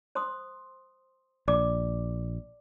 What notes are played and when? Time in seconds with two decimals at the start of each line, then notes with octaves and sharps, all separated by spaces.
0.15 C5 C6 D#6
1.48 A#1 D5 D6